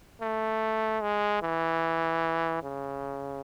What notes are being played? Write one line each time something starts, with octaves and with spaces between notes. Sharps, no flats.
A3
G#3
E3
C#3